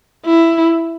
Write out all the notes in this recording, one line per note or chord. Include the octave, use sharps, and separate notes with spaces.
E4